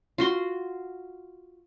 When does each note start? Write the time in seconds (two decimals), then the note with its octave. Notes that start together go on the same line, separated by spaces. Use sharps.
0.18 F4 F#4 C6